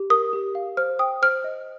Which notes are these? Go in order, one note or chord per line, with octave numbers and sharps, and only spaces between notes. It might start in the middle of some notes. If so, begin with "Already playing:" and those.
Already playing: G4
A#4 D#6
G4
F5
C5 F6
G5 D#6
C5 F6
D#5